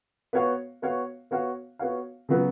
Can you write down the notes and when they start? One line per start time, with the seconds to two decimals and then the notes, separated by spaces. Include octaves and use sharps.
0.33 B3 F#4 C#5 F5
0.82 B3 F#4 C#5 F5
1.31 B3 F#4 C#5 F5
1.79 B3 F#4 C#5 F5
2.29 C#3 F#3 B3